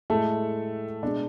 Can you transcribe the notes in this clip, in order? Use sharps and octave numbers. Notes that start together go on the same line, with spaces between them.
A2 G#3 A3 A4
B2 G#3 D4